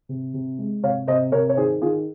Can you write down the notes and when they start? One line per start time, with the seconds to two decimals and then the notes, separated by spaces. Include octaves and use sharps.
0.09 C3
0.34 C3
0.59 G#3
0.83 C3 C#5 F5
1.07 C3 C5 D#5
1.32 C3 A#4 C#5
1.49 C#5
1.57 D#3 G#4 C5
1.82 D#3 F4 G#4